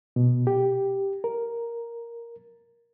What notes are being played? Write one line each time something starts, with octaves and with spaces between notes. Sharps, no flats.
B2
G4
A#4